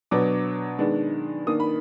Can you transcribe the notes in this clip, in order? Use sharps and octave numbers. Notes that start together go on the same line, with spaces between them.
B2 F#3 B3 D4 D6
D#3 G#3 B3 D4
D#3 A#3 D4 D#6
B5